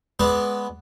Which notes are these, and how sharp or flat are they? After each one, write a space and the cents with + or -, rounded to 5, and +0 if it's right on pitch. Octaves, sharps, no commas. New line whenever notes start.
G#3 +15 B3 +0 D5 +0